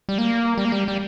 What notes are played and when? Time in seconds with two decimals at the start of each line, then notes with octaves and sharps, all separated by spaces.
0.09 G3
0.18 A#3
0.58 G3
0.65 A#3
0.72 G3
0.88 G3